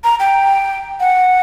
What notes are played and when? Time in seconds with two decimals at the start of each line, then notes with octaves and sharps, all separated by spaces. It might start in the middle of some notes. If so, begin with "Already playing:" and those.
0.04 A#5
0.20 G5
1.00 F#5